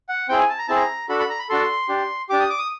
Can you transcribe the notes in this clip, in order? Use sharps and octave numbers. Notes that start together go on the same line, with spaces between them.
F#5
C4 E4 G#4 G5
G#5
A5
A#5
C4 E4 G#4 A5
A#5
D4 F#4 A4 B5
B5
A#5
B5
D4 F#4 A4 C6
D4 G4
D4 G4 D6
D#6
D6
D#6